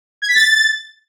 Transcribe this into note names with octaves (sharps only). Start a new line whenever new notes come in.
G#6
B6
A6